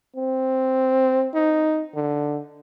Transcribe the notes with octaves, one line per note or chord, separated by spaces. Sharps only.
C4
D#4
D3